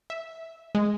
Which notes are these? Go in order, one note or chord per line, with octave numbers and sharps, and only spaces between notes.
E5
G#3